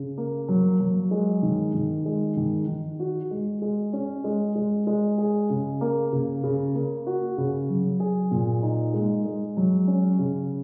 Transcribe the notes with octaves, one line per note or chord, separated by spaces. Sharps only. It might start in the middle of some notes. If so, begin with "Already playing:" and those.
Already playing: C#3
A#3
F#3
F#3
G#3
D#3
D#3
G#3
D#3
D#3
F#4
G#3
G#3
C#4
G#3
G#3
G#3
G#4
C#3
A#3
C#3
C#3
A#3
F#4
C#3
F#3
G#4
A#2
D#4
G#3
G#3
F#3
C#4
C#3